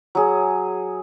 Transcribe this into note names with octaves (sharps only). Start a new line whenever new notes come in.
F#3 G#4